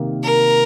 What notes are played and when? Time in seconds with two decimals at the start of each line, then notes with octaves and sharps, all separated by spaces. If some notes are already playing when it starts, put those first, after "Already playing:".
Already playing: C3 D#3 A#3
0.23 A#4